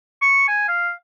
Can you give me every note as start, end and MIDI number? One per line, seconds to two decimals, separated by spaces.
0.22 0.47 85
0.48 0.67 80
0.69 0.91 77